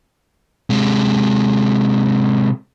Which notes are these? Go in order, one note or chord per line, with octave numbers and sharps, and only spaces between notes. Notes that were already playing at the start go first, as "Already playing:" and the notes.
C3 G#3